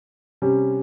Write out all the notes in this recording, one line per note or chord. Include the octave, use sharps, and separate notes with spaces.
C3 G3 C#4